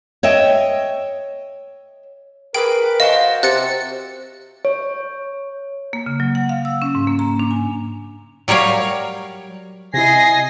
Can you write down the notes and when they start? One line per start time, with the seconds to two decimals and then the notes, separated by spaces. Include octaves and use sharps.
0.23 C#5 D#5 E5 G5
2.54 G#4 A#4 B4 G5 D6 D7
3.00 F#4 C5 D#5 F5 A5
3.43 C3 F#6 A6 C#7
4.65 C#5
5.93 A#3
6.06 C#3
6.20 F#3
6.35 F#5
6.49 F5
6.65 E6
6.82 C#4
6.95 G#2
7.07 A#3
7.19 A#5
7.40 D4
7.51 G#5
8.48 F#3 G3 A#4 C#5 F5
9.94 C3 E4 D#5 G#5 A#6 C7